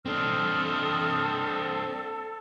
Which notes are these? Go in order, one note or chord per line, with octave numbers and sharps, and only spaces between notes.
C4 D4 A4 D#6 F6